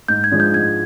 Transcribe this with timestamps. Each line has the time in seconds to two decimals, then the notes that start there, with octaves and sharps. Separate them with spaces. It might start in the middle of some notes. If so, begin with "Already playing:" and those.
0.08 G#2 G6
0.24 G#6
0.31 F3 G#3 D4
0.40 G6
0.54 G#2 G#6